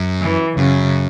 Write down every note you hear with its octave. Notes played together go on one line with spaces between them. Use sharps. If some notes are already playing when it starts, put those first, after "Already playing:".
Already playing: F#2
E3
F#2 C#3